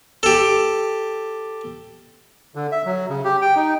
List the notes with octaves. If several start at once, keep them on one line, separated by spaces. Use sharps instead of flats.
G4 A4
D3
E5
F#3
C#3
G4
G5
D#4